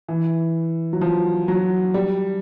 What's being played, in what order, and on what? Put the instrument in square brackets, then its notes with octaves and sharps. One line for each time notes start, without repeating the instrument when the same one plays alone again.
[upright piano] E3
F#3
F3
F#3
G3